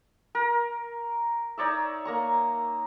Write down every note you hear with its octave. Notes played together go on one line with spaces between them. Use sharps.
A#4
D#4 C#5 D5 E5
A#3 A#5 C#6